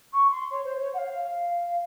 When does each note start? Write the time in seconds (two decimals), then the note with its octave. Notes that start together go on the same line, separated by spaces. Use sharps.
0.12 C#6
0.31 C6
0.50 C#5
0.64 C5
0.79 C#5
0.93 F#5
0.97 F5